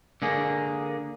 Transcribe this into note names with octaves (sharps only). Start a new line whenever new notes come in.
D3 A#3 G#4